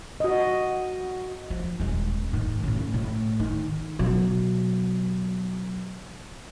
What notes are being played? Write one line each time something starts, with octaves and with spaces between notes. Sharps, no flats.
F#4 D#5
F3
D#1 G#3
A2 D#3
A2 C#3
A2
D#3
B2 F#3